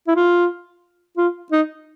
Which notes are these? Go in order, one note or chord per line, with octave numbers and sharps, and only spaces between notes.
E4
F4
F4
D#4